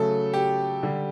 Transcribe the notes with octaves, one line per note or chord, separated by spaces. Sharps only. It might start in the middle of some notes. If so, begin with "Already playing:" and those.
Already playing: C#3 F#3 A3 A4
G4
D3 G3